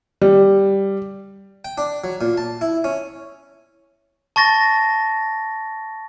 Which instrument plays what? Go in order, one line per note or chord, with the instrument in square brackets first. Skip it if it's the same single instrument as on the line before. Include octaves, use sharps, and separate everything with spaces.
[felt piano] G3
[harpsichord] G5
D4
F#3
A#2
A5
E4
C#4
[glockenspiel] A5 C#6 A6 A#6